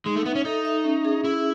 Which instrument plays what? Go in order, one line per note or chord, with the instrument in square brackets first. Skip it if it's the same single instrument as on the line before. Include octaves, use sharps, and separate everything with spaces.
[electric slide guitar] G#3 [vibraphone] D#4
[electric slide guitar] A3
[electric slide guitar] B3 [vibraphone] E5
[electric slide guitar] C#4
[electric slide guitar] D#4 [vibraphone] A4
[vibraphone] E5
C#4
G#4
[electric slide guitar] E4 [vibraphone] G#4